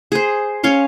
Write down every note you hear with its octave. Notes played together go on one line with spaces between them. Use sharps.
G#4 C5
C#4 C#5 F5 C6